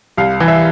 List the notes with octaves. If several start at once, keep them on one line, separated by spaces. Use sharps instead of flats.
C2 F5
E3
E5